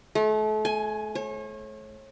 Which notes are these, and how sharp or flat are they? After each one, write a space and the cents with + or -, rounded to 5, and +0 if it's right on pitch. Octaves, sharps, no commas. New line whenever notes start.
A3 -35
G#5 +10
C#5 -35